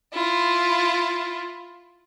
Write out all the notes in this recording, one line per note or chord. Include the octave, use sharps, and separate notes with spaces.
E4 F4